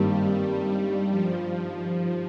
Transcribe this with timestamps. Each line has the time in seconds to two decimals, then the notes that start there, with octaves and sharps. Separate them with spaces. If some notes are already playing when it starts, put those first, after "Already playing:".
Already playing: G#1 G2 D#3 G3 A#3
1.10 F3
1.83 F3